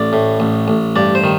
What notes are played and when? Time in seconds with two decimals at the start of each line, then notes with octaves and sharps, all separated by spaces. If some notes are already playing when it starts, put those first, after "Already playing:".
Already playing: A1 D5
0.13 A2
0.40 A1
0.68 A1
0.96 G2 D5
1.15 C5
1.24 D#3